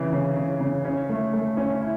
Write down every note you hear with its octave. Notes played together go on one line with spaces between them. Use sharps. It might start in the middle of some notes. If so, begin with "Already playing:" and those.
Already playing: C#3 E3
C#3
C#3
C#3
C#4
A3
A3
C#4
E4